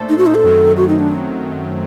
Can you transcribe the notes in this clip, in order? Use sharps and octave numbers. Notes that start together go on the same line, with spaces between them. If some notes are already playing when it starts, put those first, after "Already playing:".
Already playing: A#2 A3 D4 A4 C5
D#4
F#4
D#4
A4
F#2 D#3 F#3 A3 C4
F#4
D#4
D4